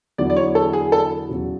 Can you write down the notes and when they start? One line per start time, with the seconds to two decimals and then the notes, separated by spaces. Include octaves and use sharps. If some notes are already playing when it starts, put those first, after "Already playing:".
0.18 E2 D3 F#3 B3 E4 D5
0.30 D5
0.36 C#5
0.55 A4
0.73 G#4
0.92 A4
1.29 E2 C#3 F#3